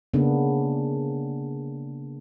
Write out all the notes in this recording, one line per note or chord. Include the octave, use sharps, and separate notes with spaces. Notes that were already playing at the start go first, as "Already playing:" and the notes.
C#3 A#3 B3 D4